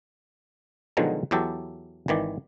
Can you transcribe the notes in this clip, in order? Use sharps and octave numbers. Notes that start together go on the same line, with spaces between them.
B2 D3 D#3 F3 F#3 G#3
E2 E3 F#3 G4 A4
G#1 D#3 E3 D5